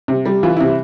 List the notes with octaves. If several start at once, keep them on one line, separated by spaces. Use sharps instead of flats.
C3
G3
E3 F4
C3 E4